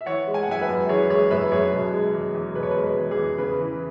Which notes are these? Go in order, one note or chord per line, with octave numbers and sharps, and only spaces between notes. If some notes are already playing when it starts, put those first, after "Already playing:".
E5
E3 C#5 F#5
G#3
G#5
F#5
F#2 E5 G#5
B4 E5
F#2
E3 G#4 C#5
G#3 G#4 C#5
F#2 B4 E5
F#2 G#4 C#5
B2
G#3
E2
E2
B2 B4
C#5
B4
G#3
B4
E2
G#4
E2
C#3 B4
E3